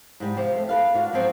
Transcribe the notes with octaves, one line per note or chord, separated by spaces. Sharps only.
G#2 G3
C3 F3 G4
A3
A4 B4 F5
D4 F4 F#4
F3 F#3 C4 F#4